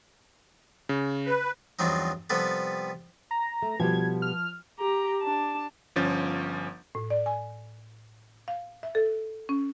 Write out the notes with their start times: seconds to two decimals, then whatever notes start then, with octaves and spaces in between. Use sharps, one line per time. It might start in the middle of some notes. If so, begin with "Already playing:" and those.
0.89 C#3
1.26 B4
1.79 E2 G2 F3 F#3 C4 D#4
2.30 C3 F3 G3 B3 A4 B4
3.31 A#5
3.62 A3
3.80 B2 F3 G3 G4 G#6
4.22 F6
4.79 G4 A#5
5.22 D4 A5
5.96 G1 F3 C#4 G6 A6
6.95 A2
7.10 D5
7.26 G#5
8.48 F5
8.83 E5
8.95 A4
9.49 C#4